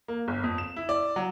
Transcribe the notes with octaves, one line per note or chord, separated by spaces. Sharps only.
A#3
G1
F2
E7
E4
D5
F#3